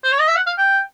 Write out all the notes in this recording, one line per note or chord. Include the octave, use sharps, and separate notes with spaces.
C5
C#5
D#5
E5
F#5
F5
G5